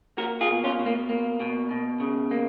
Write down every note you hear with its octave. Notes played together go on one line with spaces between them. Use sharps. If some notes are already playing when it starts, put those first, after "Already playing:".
A#3 F#4 A#4
F4 G#4
B2
C#4 F4
B2
A#3
A#3
B2
B2
C#3
A#3